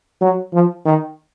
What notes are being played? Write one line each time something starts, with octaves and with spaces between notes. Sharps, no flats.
F#3
F3
D#3